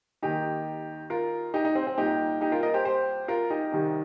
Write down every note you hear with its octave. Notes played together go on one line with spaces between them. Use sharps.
D#2 D#3 D#4 G4
F4 A#4
D#4 G4
D#4
C4
C4
C2 A#2 D#4 G4
D#4 G4
F4 A#4
A#4 D#5
G4 C5
G4 C5
F4 A#4
D#4 G4
C2 C3 D#3